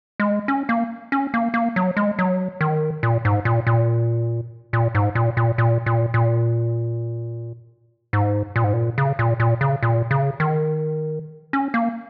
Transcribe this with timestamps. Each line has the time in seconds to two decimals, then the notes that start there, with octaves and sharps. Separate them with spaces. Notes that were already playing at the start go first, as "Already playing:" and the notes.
0.20 G#3
0.48 C#4
0.69 A#3
1.12 C#4
1.34 A#3
1.54 A#3
1.76 F#3
1.97 G#3
2.19 F#3
2.61 D#3
3.03 A#2
3.25 G#2
3.45 A#2
3.67 A#2
4.73 A#2
4.95 G#2
5.15 A#2
5.37 A#2
5.58 A#2
5.86 A#2
6.14 A#2
8.13 G#2
8.56 A#2
8.64 G#2
8.73 A#2
8.98 C#3
9.19 A#2
9.40 A#2
9.61 C#3
9.83 A#2
10.11 C#3
10.40 D#3
11.53 C#4
11.74 A#3